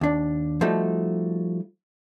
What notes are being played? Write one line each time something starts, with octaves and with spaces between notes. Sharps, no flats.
D#2 D4
F3 G3 A3 D#4 F#4